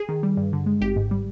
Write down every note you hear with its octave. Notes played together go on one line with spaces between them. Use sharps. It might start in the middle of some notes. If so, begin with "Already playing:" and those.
Already playing: G#4
D#3
G3
G2
D3
G#3
G#1 G4
G#2
G3